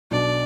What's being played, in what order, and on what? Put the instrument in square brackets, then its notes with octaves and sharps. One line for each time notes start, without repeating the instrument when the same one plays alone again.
[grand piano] B1 B2 F#3 D4 [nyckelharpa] D5